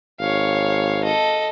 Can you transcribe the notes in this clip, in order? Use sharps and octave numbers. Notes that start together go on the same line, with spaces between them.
G#1 C#5 F5
A4 D#5